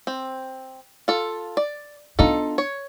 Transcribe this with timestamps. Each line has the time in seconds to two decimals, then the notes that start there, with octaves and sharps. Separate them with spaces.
0.07 C4
1.08 F4 A4
1.57 D5
2.19 B3 D4 D#4 F4 A4
2.58 C#5